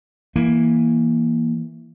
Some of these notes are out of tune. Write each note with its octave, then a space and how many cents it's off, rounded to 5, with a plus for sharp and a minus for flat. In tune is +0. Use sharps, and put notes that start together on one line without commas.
E3 +0 A#3 +10